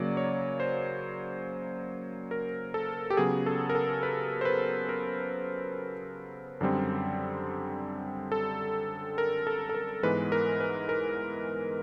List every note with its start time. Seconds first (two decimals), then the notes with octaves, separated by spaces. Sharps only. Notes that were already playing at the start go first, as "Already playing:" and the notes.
Already playing: C#3 F#3 A#3 D5
0.17 C#5
0.60 C5
2.31 A#4
2.74 A4
3.10 G4
3.17 C#3 F#3 B3 G#4
3.46 A4
3.69 A#4
3.75 A4
4.03 B4
4.41 C5
4.45 B4
4.89 A#4
6.61 F#2 D3 G3 C4
8.32 A4
9.18 A#4
9.47 A4
9.69 A4
9.74 A#4
10.03 G#2 E3 G#3 B3 B4
10.32 A#4
10.60 B4
10.89 A#4